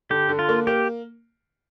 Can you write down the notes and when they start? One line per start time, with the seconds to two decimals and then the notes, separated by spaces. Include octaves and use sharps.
0.10 D3 G4
0.29 D3
0.39 F4
0.49 A#3
0.67 A#3 G4